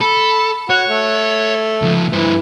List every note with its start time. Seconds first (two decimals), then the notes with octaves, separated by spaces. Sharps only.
0.01 A4 B5
0.70 F#4 C#5 F#5
0.89 A3
1.82 C#2 F3
2.13 G2 E3 C5